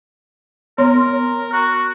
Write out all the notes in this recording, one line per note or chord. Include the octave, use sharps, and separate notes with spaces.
B3 A#4 C#5 C6
F#4